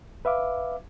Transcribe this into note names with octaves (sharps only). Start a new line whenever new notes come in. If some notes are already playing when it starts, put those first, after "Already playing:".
B4 E5 F5 D6